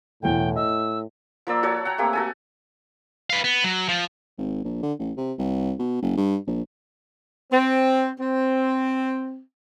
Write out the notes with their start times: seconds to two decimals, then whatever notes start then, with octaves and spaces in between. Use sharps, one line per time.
0.23 E1 E2 A2 G5
0.56 D#5 E6
1.47 F3 A#3 D5 E6
1.63 F#4 A4 C#5
1.85 F#5 G5 A#5
1.98 A3 A#3 C4 G4
2.13 F#4 A4 G#5
3.30 B4 F5
3.44 B3
3.64 F#3
3.88 F3
4.38 G#1
4.64 A#1
4.83 D3
4.99 A1
5.17 C3
5.38 C2
5.79 B2
6.02 F#1
6.17 G2
6.47 A#1
7.52 C4
8.19 C4